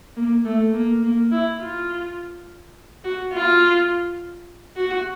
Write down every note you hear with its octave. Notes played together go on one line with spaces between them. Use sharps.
A#3
A3
A#3
A#3
E4
F4
F#4
F4
F#4